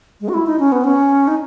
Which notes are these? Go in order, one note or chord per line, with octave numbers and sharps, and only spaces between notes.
G#3
F#4
E4
D#4
C#4
B3
C#4
D#4